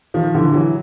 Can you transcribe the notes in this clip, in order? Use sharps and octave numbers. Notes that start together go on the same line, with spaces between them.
D#3 F3
D3 E3
E3 F#3